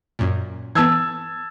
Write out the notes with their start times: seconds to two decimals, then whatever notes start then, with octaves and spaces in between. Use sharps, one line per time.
0.19 F#2 A#2
0.75 E3 B3 A5 E6 G#6